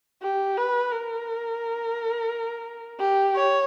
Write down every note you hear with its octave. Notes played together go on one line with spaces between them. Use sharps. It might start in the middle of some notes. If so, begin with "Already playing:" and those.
G4
B4
A#4
G4
C#5